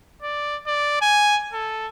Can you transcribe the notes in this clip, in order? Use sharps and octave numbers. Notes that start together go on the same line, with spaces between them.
D5
D5
G#5
A4